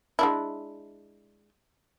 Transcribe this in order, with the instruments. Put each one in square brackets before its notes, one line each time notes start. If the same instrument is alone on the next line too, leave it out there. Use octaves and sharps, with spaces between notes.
[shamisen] G#3 D4 E4